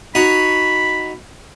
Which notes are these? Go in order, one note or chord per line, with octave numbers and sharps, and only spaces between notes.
D#4 F#4 C#5 B5